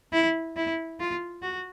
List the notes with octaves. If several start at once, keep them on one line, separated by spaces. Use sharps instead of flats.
E4
E4
F4
F#4